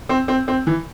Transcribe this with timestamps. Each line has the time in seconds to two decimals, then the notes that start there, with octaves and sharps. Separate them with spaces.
0.09 C4
0.28 C4
0.48 C4
0.67 E3